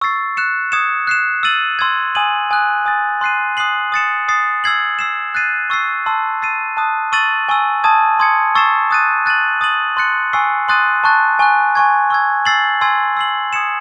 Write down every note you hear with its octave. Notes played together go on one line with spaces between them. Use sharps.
C#6 E6 A6 C7
F#6 C#7 E7
D#6 G#6 C#7 E7
F#6 C7 E7
E6 A6 D#7 F#7
C6 E6 G#6
G#5 D#6 G#6 D#7 F#7
G#5 D#6 F#6
G#5 D#6 A6
C6 F#6 C7 D#7
D#6 F#6 C7 F#7
D#6 A6 C#7 E7
D#6 A6 C7
E6 G#6 C7 F#7
E6 C7 E7
F#6 A6 C7 D#7
C#6 E6 A6 C7
A5 C6 E6
E6 A6 C7 D#7
A5 D#6 F#6
C#6 E6 A6 D#7 F#7
G#5 C#6 E6
A5 D#6 G#6 D#7
C6 D#6 G#6 C#7
C#6 E6 A6 C7 E7
D#6 F#6 A6 D#7
F#6 A6 D#7 F#7
D#6 A6 D#7 F#7
C6 F#6 A6 C#7
G#5 C#6 E6 C7
C6 D#6 F#6 A6 D#7
A5 C#6 F#6 A6
G#5 C#6 F#6
G#5 C#6 G#6
C#6 E6 G#6
E6 A6 C7 F#7
G#5 C6 E6 G#6 C7
E6 C7 F#7
D#6 G#6 C#7 E7